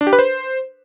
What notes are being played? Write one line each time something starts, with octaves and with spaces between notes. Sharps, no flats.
D4
G4
B4
C5